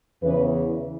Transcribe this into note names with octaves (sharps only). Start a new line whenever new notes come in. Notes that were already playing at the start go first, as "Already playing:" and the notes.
E2 C#3 E3 B4